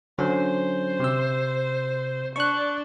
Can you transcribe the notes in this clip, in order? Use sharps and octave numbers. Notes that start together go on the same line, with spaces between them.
D3 F#3 C#4 C5
C3 E6
D4 C#6 F#6